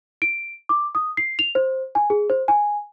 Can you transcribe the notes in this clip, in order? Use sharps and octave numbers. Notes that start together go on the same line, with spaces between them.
D7
D6
D#6
C7
F7
C5
G#5
G#4
C5
G#5